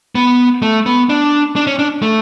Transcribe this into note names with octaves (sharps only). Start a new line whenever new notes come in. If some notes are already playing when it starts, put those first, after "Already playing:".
B3
A3
B3
D4
D4
C#4
D4
A3